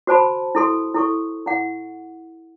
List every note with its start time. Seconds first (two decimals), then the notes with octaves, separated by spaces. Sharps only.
0.07 F#4 C5 A5 B5
0.55 E4 A4 C6
0.94 E4 A4 C#6
1.46 E4 F#5